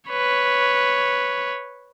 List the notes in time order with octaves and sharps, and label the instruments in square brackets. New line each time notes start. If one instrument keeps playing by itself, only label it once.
[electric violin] B4 C#5